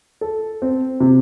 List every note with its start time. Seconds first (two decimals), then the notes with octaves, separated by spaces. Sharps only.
0.21 A4
0.62 C4
1.00 C3